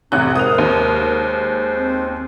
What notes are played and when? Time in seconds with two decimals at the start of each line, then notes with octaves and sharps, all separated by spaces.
0.12 A1 F2 C3 D#4 F#6
0.36 G#3 G#4 A#4 C5 D#6 F7
0.58 D#2
1.76 C4